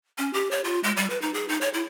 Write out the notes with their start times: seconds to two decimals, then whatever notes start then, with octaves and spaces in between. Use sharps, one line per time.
0.18 C#4
0.33 G4
0.51 C#5
0.64 F4
0.83 G#3
0.97 G3
1.10 B4
1.22 D#4
1.34 G#4
1.48 D#4
1.61 C#5
1.74 E4